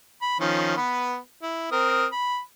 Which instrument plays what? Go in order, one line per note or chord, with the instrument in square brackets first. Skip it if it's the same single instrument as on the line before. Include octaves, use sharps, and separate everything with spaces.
[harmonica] B5
D#3 F3 C#4
B3 B4
E4
C4 A#4 D#6
B5